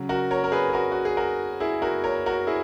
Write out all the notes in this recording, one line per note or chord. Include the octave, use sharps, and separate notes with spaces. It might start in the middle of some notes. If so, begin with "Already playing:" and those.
Already playing: C#3 F#3
F#4 A#4
A#4 C#5
A#4
G#4 B4
G#4
F#4 A#4
F#4
G#4
F#4 A#4
E4 G#4
F#4 A#4
A#4 C#5
F#4 A#4
E4 G#4